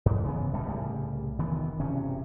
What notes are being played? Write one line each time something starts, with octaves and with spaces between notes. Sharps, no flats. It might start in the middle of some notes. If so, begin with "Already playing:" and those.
G2
C#3 E3 G#3 B3
D1 B2 G3 A3
C2 A2 C#3 G3
F1 D#3 E3 B3
E1 G2 C3 C#4